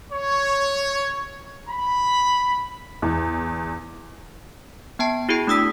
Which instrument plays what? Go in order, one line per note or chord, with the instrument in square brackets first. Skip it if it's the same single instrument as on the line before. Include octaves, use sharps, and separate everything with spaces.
[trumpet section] C#5
B5
[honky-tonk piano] E2
[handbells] B3 G5 A5
E4 F#4 G#4 G5
A3 D4 D#6 E6 B6